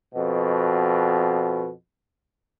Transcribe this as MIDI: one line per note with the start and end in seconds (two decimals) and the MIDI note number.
0.14 1.70 41
0.14 1.70 47